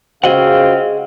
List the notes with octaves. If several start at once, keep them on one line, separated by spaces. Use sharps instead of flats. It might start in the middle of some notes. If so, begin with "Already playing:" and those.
C#2 C#3 C4 F#4 G#4 D#5 F5 F#5